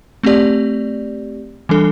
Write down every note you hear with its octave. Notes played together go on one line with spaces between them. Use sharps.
A3 C4 G4 D5
E3 G3 D4 A4